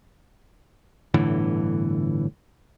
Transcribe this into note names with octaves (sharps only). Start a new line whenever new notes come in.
G1 A2 D3 E3